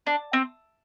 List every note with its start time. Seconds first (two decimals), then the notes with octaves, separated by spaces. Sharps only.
0.07 D4
0.33 C4